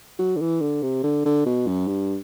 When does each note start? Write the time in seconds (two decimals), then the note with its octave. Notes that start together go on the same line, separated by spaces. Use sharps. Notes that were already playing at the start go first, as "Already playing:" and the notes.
0.19 F#3
0.36 D3
0.41 E3
0.61 D3
0.82 C3
1.03 D3
1.25 D3
1.46 B2
1.67 F#2
1.88 G2